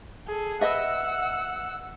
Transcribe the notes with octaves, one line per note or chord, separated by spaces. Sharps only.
G#4 A4
B4 D#5 E5 F#5 E6